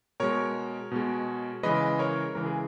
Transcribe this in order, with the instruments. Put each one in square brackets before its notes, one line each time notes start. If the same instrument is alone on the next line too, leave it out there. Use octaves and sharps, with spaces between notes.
[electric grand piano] B2 G#3 A#4 C#5
B2 G#3
C#3 E3 G#3 B4 D#5
A#4 C#5
C#3 E3 G#3 A#4
G#4